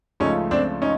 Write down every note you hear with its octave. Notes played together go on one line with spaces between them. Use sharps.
C#2 C#3 F3 A3 C#4 D#4
C4 D4
C#4 D#4